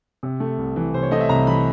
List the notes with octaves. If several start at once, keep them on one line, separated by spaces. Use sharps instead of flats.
C3
A3
C2
E3
C3 C5
C#5
A3 D#5
E5
C2 A#5
E3 B5